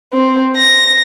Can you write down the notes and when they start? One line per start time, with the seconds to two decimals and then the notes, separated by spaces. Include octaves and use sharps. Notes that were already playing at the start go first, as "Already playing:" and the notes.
0.13 C4
0.56 A#6